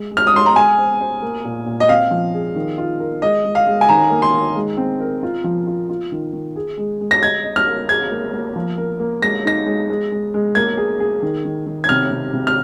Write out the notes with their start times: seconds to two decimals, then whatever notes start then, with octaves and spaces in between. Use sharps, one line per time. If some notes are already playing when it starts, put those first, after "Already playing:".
Already playing: G#3
0.11 G#3
0.17 F6
0.27 D#6
0.34 G#3 C6
0.46 A#5
0.55 G#3 G#5
0.78 C5
1.00 C5
1.22 A#3
1.45 A#2
1.66 A#2
1.80 D#5
1.88 C4 F5
2.11 F3
2.34 G#4
2.55 D#3
2.78 F4
3.00 A#4
3.22 G#3 D#5
3.45 G#3
3.55 F5
3.67 G#3
3.81 G#5
3.89 D#3 A#5
4.11 A#3
4.22 C6
4.34 D#3
4.55 G#3
4.77 C4
5.00 A#4
5.23 F4
5.44 F3
5.67 F4
5.89 F4
6.12 D#3
6.33 D#3
6.56 G#4
6.77 G#3
7.01 G#3
7.11 A#6
7.23 D#5 G#6
7.44 D#5
7.56 F6
7.67 A#4
7.89 G#4 G#6
8.11 A#3
8.33 A#3
8.56 F3
8.78 A#4
8.99 A#3
9.22 G#3 A#6
9.45 D#4 A#6
9.66 G#3
9.90 G#3
10.12 G#3
10.34 G#3
10.55 A#3 G#6
10.77 G#4
11.00 G#4
11.22 D#3
11.45 D#3
11.66 D#3
11.84 G#6
11.89 C3 F6
12.11 C3
12.33 C3
12.47 F6